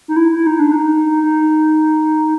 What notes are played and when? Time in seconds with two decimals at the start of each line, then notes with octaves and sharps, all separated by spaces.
0.08 D#4
0.16 E4
0.35 E4
0.47 D#4
0.60 D4
0.72 D#4
1.24 D#4